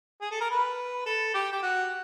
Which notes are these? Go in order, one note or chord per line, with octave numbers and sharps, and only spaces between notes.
G#4
A4
A#4
B4
A4
G4
G4
F#4